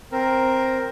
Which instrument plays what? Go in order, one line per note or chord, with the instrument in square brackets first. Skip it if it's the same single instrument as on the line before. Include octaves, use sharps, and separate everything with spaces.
[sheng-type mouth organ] C4 A#4